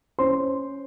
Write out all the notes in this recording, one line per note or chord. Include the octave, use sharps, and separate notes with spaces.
C#4 C5 C6